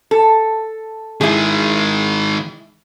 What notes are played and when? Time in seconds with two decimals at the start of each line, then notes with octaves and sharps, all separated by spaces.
0.11 A4
1.21 D#3 G#3 E4 G#4